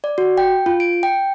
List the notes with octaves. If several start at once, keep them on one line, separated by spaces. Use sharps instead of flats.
D5
F#4
G5
F4
D7
G5